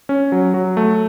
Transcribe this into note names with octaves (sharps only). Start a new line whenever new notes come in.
C#4
F#3
F#3
A3